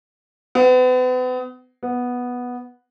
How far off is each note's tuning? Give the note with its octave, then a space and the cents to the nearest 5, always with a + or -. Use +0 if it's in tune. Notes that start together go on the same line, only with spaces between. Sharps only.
B3 +40
B3 -5